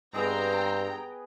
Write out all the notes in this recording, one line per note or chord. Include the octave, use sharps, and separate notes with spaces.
G2 B3 C4 G#4 D#5 G5 A#5